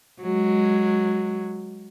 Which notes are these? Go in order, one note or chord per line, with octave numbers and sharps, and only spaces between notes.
F#3 G#3